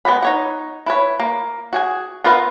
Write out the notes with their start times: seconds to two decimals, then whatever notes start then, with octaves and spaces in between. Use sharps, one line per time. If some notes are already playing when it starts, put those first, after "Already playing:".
0.05 G#3 B3 F#4 F#5 B5
0.22 D#4 C#5 F#5
0.86 E4 B4 C#5
1.20 A#3
1.73 F#4 G#4 G#5
2.24 B3 F4 A#4 B4 F5